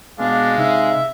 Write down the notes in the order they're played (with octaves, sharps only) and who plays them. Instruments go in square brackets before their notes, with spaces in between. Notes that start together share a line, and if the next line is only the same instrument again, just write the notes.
[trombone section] B2 [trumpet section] G#3 F5 [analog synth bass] B3 [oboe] D4
[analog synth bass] C3 [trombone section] D#4 [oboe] E5